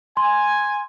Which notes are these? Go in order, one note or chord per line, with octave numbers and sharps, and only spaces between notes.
G#5 C6